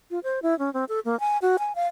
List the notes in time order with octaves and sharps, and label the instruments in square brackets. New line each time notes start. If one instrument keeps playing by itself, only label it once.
[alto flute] F4
C5
E4
C#4
C4
A4
A#3
G#5
F#4
G#5
F5